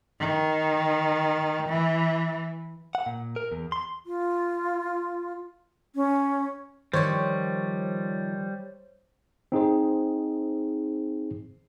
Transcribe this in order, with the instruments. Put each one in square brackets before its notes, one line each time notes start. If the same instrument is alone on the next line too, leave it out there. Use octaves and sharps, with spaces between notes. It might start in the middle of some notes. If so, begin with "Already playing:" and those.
[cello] D#3
E3
[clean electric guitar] F#5
A#2
A#4
E2
C6
[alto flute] F4
C#4
[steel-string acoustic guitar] D#3 F3 [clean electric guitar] G3 [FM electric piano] C5 C#5
[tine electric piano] C4 D#4 G#4 C5